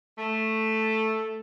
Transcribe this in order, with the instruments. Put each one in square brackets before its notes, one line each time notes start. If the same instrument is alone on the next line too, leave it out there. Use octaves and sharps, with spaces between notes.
[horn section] A3